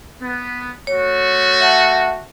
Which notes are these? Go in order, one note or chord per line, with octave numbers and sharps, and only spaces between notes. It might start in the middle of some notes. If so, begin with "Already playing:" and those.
B3
A3 F#4 C#5
E5 F#5 A5